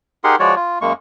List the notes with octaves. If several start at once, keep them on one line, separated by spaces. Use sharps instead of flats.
D#4 G4 G#4 A#4 F#5 C6
F3 G#3 F#4 C#5 D5
F4
F#2 G#3 A#3 C#6